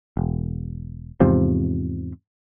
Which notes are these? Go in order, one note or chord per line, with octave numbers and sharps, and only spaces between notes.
E1
E2 G#2 C3 F3